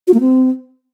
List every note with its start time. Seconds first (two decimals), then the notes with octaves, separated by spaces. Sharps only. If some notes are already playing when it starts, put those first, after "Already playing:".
0.07 F#4
0.14 A#3
0.20 C4